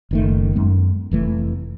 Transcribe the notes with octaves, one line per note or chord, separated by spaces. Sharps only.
F#1 D#3 A3
F#2 G#3 B3
F1 E3 A3